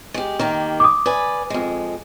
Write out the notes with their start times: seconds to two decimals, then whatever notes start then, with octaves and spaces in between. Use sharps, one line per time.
0.14 G#3 G4
0.39 D#3 A#3 G4
0.80 D6 D#6
1.06 B4 D5 G#5
1.50 F2 G#3